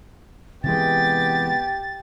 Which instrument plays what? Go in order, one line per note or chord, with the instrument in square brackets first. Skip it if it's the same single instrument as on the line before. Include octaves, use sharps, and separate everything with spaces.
[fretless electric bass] C3 E3 G#3 [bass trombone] B3 [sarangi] G4 [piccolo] A6